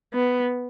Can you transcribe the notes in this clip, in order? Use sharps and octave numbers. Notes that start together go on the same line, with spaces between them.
B3